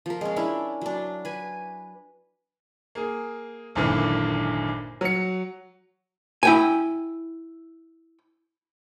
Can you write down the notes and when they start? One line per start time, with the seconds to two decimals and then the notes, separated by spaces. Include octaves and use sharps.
0.06 F3 A#4
0.21 G#3 C#4
0.36 C#4 D4 E4
0.81 F#3 D4
1.25 B4 G#5
2.95 A#3 G#4
3.75 G#1 F#2 A#2 D3 E3
5.01 F#3 C#7
6.43 E4 G5 G#5